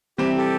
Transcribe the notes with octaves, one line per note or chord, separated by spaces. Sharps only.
C3 E3 G3 C4 G4
G4 A4